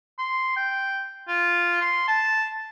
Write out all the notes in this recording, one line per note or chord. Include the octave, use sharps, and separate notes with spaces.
C6
G5
F4
C6
A5